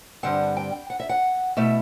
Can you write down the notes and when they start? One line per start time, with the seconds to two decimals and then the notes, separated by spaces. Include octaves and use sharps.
0.23 G2 D3 G3 C4 F#5
0.57 G5
0.90 F#5
1.00 E5
1.09 F#5
1.57 B2 A3 E4 E5